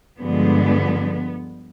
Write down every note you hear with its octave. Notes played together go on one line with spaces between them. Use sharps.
G2 D3 F3 G#3 B3